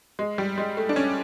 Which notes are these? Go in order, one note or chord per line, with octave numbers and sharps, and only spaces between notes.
G#3
G3
G#3
A3
D4
C#4